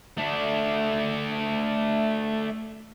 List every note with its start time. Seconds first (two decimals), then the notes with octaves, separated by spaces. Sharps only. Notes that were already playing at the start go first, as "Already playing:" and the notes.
0.18 A3 D4